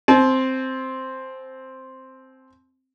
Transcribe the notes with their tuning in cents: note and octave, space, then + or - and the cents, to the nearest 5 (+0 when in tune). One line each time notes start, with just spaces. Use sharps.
C4 +0 A5 -40